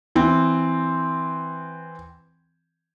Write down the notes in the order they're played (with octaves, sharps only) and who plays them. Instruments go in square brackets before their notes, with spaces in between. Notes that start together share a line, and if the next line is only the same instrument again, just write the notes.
[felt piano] E3 C4